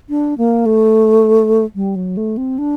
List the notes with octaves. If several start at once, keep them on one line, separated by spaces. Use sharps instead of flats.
D4
A#3
A3
G3
F#3
A3
C4
D4